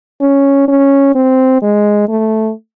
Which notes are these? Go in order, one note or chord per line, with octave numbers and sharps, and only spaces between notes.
C#4
C#4
C4
G#3
A3